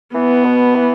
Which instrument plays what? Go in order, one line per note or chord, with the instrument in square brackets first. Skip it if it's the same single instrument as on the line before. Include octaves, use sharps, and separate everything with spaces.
[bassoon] E3 [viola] B3
[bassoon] B2
E3